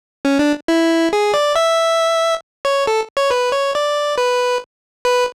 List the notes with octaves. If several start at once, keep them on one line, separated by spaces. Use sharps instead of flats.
C#4
D4
E4
G#4
D5
E5
C#5
A4
C#5
B4
C#5
D5
B4
B4